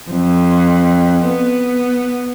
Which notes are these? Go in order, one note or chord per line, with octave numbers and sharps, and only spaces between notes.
F2
B3